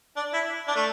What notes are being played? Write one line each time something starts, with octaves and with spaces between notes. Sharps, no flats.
D4
E4
D4
A3